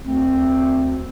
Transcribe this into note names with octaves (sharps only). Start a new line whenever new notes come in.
D2 A3 C4